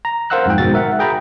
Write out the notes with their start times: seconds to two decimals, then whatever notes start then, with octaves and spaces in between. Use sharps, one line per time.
0.05 A#5
0.30 A#4 C5 F5 F#5 E6 F#6
0.46 F2 G#2 F3 G5
0.58 G1 G#2 B2 F#4 A6
0.74 A#4 E5 F#5
0.99 G#4 G5 A#5 B5